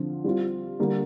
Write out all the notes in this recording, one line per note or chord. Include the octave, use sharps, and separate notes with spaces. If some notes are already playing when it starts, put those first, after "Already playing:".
Already playing: D3 F3 C4 F4
G3 C4 F4
D3 G3 A#3 D4